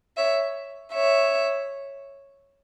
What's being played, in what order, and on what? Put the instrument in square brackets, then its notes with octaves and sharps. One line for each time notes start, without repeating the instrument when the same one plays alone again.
[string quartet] C#5 E5
C#5 E5